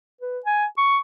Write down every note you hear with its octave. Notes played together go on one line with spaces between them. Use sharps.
B4
G#5
C#6